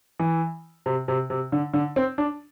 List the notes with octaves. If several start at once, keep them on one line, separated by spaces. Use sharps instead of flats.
E3
C3
C3
C3
D3
D3
C4
D4